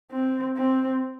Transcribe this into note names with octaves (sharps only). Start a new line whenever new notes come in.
C4
C4